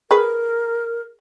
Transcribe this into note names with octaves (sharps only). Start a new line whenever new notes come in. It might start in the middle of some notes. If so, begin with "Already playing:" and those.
G#4 A#4 B4